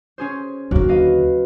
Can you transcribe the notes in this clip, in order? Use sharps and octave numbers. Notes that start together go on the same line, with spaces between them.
C#4 G#4 C5
D#2 D3 F#3 A#3 F#4
B4 D#5 F5